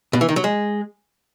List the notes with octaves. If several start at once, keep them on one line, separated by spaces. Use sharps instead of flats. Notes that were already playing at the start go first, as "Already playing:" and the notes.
B2
E3
D#3
F#3
G#3